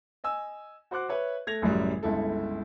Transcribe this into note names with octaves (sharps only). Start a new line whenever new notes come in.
D#5 G#5 E6
F#4 C5 F#5 D6 F#6
B4 C#5 E5
A3 G#6 A#6 F7
A1 F#2 C#3 F#3 G3
G1 C#2 E4 A4